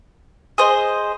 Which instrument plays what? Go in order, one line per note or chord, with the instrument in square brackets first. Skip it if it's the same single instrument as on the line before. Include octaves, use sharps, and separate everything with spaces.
[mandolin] G#4 C5 D#5